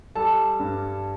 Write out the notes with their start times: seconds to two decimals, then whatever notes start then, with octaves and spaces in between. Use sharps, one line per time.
0.16 G3 A4 A5
0.60 G2